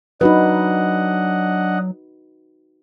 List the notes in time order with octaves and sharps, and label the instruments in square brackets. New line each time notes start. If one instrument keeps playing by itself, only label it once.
[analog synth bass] F#3 [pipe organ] D4 D#5 F#5 [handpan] D#4 F#4 B4